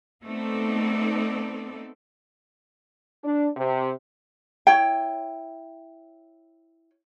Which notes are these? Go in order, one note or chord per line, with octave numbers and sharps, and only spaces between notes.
A3 B3 C4 D#4 A4 D5
D4
C3
E4 C#5 G5